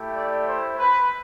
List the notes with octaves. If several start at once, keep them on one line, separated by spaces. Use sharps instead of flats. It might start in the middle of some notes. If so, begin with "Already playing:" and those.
Already playing: A3 E4 G4
D5
C5
B4